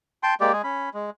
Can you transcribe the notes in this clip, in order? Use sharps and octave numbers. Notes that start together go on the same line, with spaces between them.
G5 A5 C6
G#3 A#3 G4 D5
G#3 G#4
C#4 B5
G#3